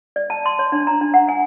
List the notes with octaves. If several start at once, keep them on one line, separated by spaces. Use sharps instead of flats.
D5
A5
C6
C#5
D4
A#5
D4
F#5
G#5